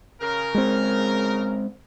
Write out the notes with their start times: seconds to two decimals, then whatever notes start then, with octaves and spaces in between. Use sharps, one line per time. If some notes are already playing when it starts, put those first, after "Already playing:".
0.21 C#3 A#4
0.55 G#3 C4